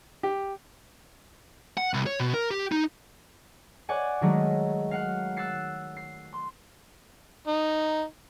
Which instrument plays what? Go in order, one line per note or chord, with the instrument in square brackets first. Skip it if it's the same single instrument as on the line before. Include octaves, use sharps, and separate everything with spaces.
[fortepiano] G4
[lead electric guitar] F#5
C2
C#5
B2
A#4
G4
D#4
[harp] C#5 D5 F#5 G#5
D#3 F#3 G#3 A3 D#4
F5 F#5
E6 F#6 A6 C7 C#7
C7
C6
[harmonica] D#4